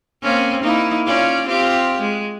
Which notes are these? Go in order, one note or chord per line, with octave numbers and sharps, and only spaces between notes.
A#3 C4 C#4
A#3 D#4 E4
C#4 F4 D5
C4 F4 G4
G#3